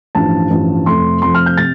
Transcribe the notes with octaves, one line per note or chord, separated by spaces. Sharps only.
A1 G2 F3 A5
A1 G2 F3
F1 F2 F3 A3 C6
F1 F2 F3 A3 C6
F6
G6
C3 A6